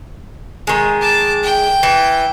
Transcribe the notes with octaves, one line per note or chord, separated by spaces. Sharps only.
D#3 G#3
A5 D6
G5
E3